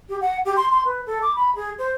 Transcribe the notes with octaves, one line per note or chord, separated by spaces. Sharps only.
G4
F#5
G4
C6
C6
B4
A4
D6
B5
G#4
C5